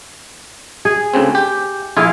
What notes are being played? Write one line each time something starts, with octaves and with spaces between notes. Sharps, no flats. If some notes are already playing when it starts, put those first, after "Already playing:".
G#4
D2 C#3 C4
G4
A#1 E4 F4 G#4 F5